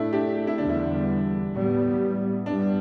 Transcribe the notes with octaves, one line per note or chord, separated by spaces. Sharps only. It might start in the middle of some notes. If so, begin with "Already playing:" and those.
Already playing: A2 A3 D4 E4
D4 G4
G4
E4
E2 D3 G3 B3 D4
E4
A2 G3 B3
G2 G3 B3 D4